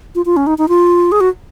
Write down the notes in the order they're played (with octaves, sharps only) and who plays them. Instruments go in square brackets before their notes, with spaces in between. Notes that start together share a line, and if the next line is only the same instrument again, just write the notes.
[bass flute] F4
F4
C#4
D#4
D#4
F4
G#4
F#4